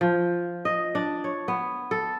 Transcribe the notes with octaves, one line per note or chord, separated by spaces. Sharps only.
F3
D#5
D4
C#5
B3
A4